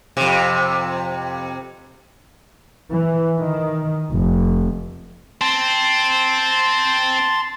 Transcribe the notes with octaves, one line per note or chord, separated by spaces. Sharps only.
F2 C3
E3
D#3
F1
C4 A5 C6